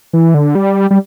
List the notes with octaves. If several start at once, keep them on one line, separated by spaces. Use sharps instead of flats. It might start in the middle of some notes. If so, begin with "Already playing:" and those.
E3
D3
G3
G3